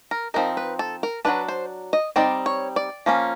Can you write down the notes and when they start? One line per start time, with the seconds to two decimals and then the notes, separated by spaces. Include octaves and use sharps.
0.11 A#4
0.34 F3 G#3 C4 D#4 A#4
0.57 B4
0.79 A4
1.03 A#4
1.25 F#3 A3 D4 B4
1.48 C5
1.93 D#5
2.16 G3 C4 D#4 D5
2.46 C#5
2.76 D5
3.06 F3 A#3 C#4